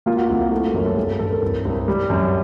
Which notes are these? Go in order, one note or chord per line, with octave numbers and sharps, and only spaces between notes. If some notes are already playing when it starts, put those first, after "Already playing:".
A#3 F4
F#4
C2 F4
E4
A3 F4
F#2 A#4
A4
G2 G#4
A4
G2 A4
A#4
C2
C2
G3
F#2